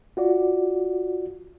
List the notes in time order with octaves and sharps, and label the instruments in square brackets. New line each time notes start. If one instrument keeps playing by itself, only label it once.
[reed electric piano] F4 F#4 D5